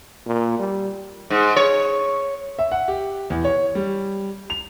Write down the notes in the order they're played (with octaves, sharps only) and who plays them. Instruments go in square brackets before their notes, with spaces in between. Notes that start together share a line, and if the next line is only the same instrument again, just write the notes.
[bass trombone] A#2
G3
[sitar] G#2
C#5
[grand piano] E5
F#5
G4
E2
C#5
G3
F7